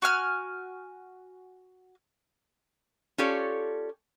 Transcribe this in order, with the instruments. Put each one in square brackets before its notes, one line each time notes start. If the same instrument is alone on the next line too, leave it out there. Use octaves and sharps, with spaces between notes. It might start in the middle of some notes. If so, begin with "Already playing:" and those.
[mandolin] F#4 G#5 F6
[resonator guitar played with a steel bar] C#4 F4 G4 A4 C#5 D5